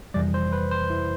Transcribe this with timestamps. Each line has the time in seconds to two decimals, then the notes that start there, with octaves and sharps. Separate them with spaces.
0.14 F2 C3 E3 G3 D5
0.34 C5
0.53 B4
0.71 C5
0.90 E4